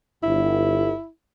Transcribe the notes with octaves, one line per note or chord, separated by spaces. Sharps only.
G1 E4